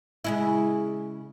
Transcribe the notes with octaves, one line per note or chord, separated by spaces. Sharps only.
C#3 G#3 E4